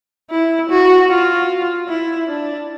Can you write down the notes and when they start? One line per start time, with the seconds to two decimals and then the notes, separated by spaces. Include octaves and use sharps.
0.31 E4
0.70 F#4
1.10 F4
1.88 E4
2.29 D4